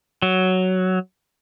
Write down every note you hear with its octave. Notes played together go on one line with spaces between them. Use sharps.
F#3